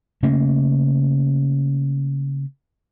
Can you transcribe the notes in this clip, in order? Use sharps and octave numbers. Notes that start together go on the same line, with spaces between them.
C#3 A3 A#3 C#4